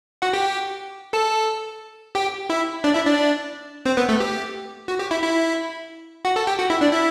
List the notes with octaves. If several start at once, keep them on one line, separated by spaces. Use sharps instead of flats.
F#4 F#5
G4 G5
A4 A5
G4 G5
E4 E5
D4 D5
E4 E5
D4 D5
C4 C5
B3 B4
A3 A4
G4
F#4
G4
E4 E5
E4 E5
F#4 F#5
A4 A5
G4 G5
F#4 F#5
E4 E5
D4 D5
E4 E5